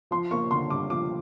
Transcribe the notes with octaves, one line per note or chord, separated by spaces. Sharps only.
F3 C6
A#3 C#6
D3 C6
G2 D6
F3 D6